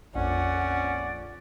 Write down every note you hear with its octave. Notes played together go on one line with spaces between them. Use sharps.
A#1 F2 C#4 D5 F#5